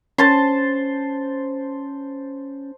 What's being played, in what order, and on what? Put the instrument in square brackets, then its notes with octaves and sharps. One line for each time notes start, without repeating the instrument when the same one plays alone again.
[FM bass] C#4 [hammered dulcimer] C5 A5 C6